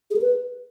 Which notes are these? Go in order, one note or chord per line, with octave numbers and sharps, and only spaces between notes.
G#4
A#4
B4